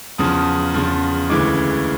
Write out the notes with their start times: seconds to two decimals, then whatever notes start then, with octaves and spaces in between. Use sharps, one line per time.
0.18 E2 C#3 F3 D#6
0.74 E2 C#3 F3
1.29 D2 C#3 E3 G#3 D6